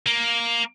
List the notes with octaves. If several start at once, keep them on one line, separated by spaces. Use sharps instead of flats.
A#3